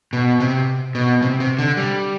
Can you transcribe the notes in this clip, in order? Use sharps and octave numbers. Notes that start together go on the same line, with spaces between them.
B2
C3
B2
C3
C3
D3
G3